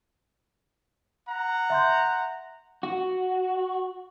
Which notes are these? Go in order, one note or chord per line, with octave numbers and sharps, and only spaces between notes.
F#5 A#5
E5 C6 G6
F#4